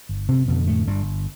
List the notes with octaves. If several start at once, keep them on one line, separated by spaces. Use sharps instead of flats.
G1
C3 C4
F2 B2 D3 B3
A2 A3
G1 G2 G3